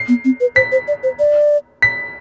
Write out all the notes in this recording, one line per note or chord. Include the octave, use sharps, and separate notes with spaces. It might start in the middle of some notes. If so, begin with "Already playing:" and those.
Already playing: C7
B3
C4
B4
C5 B6
C5
D5
C5
D5
B6